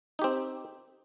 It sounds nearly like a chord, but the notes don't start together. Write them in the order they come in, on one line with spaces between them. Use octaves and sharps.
D#4 G4 C4